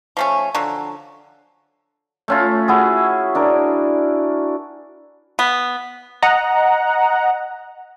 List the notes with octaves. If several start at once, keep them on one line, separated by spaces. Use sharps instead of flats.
F3 A3 C#4
D3 F3 F#3
A3 C#4 F4
E4 F#4 G#4
D4 A#4
B3
D#5 F#5 A#5